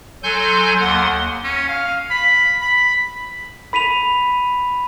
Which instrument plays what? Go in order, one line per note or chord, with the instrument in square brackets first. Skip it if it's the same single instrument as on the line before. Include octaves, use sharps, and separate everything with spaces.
[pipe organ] F#3 A4 G#5 C6 G6
D#2 F#5 C6
[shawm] C#4
F5
B5
B5
[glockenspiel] B5 B6 D#7 F7